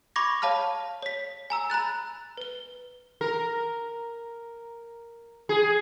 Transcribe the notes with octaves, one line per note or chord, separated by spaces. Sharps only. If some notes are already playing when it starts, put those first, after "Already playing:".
B5 C#6 D6 G#6 A#6
C#5 F5 A5 B5 F6
C#5 B6
G#5 A#5 E6
A#5 B5 F#6 A6
B4 G7
A#4
G#4